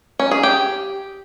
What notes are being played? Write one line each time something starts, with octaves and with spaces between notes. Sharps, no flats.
C#4
G#4
G4